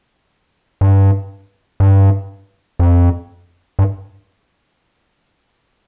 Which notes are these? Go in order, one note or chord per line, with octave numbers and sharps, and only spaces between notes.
G2
G2
F2
G2